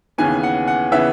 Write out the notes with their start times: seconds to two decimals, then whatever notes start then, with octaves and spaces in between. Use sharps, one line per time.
0.18 D#2 C#3 E3 B3 G#5
0.43 F#5
0.68 F#5
0.92 C#3 E3 B3 E5